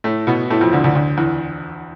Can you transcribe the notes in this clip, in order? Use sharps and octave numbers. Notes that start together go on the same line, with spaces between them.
A2 A3
B2 B3
A2 A3
F2 F3
D2 D3
D2 D3
D2 D3
E2 E3